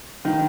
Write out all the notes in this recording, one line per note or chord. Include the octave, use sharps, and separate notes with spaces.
D#3